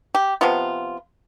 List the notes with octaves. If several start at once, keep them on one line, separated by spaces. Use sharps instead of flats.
G4
C3 F3 B3 F4